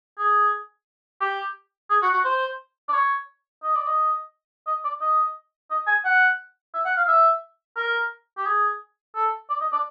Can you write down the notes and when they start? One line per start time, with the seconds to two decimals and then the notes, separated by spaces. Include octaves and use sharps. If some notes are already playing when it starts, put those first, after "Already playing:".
0.18 G#4
1.21 G4
1.90 G#4
2.02 F#4
2.13 F#4
2.25 C5
2.89 D5
2.93 C#5
3.63 D#5
3.75 D5
3.87 D#5
4.67 D#5
4.84 D5
5.01 D#5
5.71 D#5
5.87 G#5
6.05 F#5
6.74 E5
6.85 F#5
6.97 F5
7.08 E5
7.77 A#4
8.38 G4
8.46 G#4
9.16 A4
9.50 D5
9.61 D#5
9.72 D5